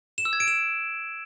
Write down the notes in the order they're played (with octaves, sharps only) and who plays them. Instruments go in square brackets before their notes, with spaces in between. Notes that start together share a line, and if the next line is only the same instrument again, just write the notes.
[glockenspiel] E7
E6
G#6
D7
E7